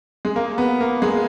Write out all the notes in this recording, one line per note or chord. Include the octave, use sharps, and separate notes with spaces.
G#3
A#3
B3
A#3
G#3